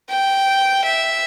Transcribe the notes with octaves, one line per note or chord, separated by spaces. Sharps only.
G5
E5